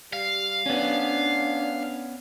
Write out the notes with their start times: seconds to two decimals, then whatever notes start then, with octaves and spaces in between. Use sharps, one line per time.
0.13 G3 F5
0.66 B3 C#4 D4